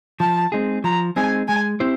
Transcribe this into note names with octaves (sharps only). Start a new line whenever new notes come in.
F3 A5
G#3 C4 D#4 G#4
F3 A#5
G#3 C4 D#4 G#4 G#5
G#3 G#5
C4 E4 G4 C5